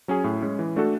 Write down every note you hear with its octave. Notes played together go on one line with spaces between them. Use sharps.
F#3 C#4 G#4
A2
G#3 C#4
E3
A3 D4 F#4 A4